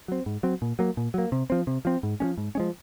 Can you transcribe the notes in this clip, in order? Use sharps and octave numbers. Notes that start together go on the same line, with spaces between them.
F#3 C4
G#2
F#3 C4
A#2
F#3 A#3
A#2
F#3 A#3
C3
F3 C4
C3
F3 C4
G#2
F3 G#3 C#4
G#2
F3 G#3 C#4